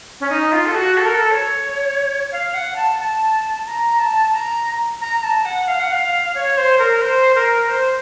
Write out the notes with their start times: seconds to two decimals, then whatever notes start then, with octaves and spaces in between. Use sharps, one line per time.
0.20 C#4
0.30 D#4
0.52 F4
0.66 A4
0.75 F#4
0.97 A4
1.06 A#4
1.14 A4
1.31 C#5
2.32 F5
2.54 F#5
2.76 A5
2.99 A5
3.66 A#5
4.00 A5
4.33 A#5
5.01 A#5
5.23 A5
5.45 F#5
5.68 F5
5.80 F#5
5.92 F5
6.35 C#5
6.57 C5
6.79 A#4
7.02 C5
7.35 A#4
7.69 C5